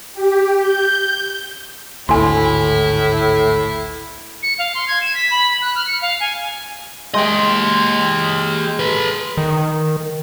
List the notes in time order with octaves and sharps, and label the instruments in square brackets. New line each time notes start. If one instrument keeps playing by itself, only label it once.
[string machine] G4
G6
[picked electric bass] G#1 D2 [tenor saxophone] A2 [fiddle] E4 [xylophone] G#5 C6
[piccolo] C#7
F5
C6
G#6
E7
B6
B5
F#6
F6
C#7
F5
G#5
[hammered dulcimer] G#3 G5 [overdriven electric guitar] G4 D#5
[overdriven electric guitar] A4 B4
[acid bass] D#3